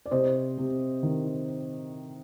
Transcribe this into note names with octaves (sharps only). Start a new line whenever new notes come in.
D5
C3 C5 D#5
C3
D#3